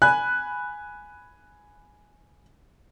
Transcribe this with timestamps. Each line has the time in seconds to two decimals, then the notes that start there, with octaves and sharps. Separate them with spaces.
0.02 G#5 B5 F#6